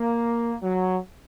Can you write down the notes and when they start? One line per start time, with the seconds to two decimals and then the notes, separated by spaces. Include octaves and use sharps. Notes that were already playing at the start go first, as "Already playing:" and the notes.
Already playing: A#3
0.62 F#3